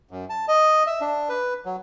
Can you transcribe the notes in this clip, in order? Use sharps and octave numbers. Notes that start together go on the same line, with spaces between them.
F#2
A5
D#5
E5
D4
B4
F#3